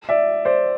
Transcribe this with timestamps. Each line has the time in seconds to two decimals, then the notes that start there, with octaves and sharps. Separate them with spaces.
0.09 D5 E5
0.45 C5 D5